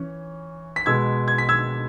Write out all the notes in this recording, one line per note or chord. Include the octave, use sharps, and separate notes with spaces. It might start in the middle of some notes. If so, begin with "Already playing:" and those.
Already playing: E3 C#4
B6
B2 G#3 B3 E6 G#6
G#6
B6
E6 G#6